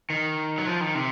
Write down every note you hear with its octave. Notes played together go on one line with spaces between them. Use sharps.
D#3
F#3
F3
D#3
C3